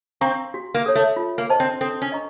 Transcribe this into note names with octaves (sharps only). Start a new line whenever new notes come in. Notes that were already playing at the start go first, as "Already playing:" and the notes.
C4 F5 A#5 C#6
F#4
A#3
A4 C#5
A3
F4
A#3
C5 D#5 A5
C4
C4 A4
C#4
D#5 A#5 C#6